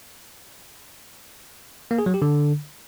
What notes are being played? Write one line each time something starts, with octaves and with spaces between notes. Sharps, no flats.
A#3
G#4
F#3
G4
D3